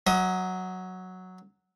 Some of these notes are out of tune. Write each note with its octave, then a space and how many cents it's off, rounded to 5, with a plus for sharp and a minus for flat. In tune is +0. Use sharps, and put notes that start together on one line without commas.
F#3 +0 D#5 +45 D#6 +0